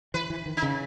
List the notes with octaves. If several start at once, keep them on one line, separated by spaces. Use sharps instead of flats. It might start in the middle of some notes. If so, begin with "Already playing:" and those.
E3 B4
E3
D#3
D#4
C#3